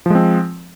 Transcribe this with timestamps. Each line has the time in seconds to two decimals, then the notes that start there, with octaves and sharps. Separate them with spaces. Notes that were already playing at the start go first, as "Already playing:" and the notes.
0.06 F3
0.10 G#3
0.15 C4